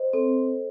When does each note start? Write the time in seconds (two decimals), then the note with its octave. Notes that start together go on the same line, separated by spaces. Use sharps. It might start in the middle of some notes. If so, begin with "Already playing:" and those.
Already playing: C5 D#5
0.13 C4 A4